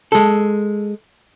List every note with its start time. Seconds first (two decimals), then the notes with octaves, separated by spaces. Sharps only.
0.12 G#3 A4